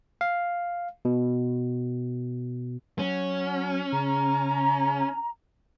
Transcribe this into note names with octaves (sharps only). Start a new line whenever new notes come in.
F5
B2
F#3 C#4
C#3 A#5